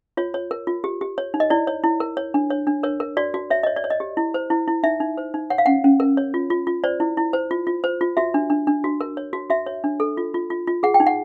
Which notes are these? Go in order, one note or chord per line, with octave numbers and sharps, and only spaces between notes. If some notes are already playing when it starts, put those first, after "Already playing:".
F4 C#5
C#5
A#4
F4
G4
G4
C#5
D#4
D#5
E4 D5
C#5
E4
A#4
C#5
D4
C#5
D4
A#4 C#5
A#4
F#4 D5
F#4
C#5 E5
C#5 D#5
D5
C#5
D#5
G4
E4
C5
E4
E4
D#4 E5
D#4
C5
D#4
C#5 F#5
F5
C#4 F#5
C#4
A#4
C#5
F4
F4
F4
C5 D5
E4
E4
C5
F4
F4
C5
F4
F#4 E5
D4
D4
D4
F#4
A#4
C#5
F#4
F#4 E5
C#5
D4
A4
F4
F4
F4
F4
G#4 F#5
G5
D#4
F#5